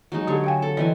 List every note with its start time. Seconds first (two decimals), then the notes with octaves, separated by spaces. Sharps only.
0.12 F#3 G#3 D#4
0.27 D3 G4 C#5
0.44 F5 G5 G#5
0.62 A4
0.77 E3 C4 D5 D#5 G#5